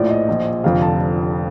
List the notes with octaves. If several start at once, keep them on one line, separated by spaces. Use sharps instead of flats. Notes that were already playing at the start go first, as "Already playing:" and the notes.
Already playing: A#1 A2 F3 D5
D#5
A#1 A#2 F3
F1 F2 D3 F3 F5
A5